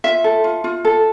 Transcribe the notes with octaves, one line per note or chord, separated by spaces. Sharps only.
F4 E5
A4
F4
F4
A4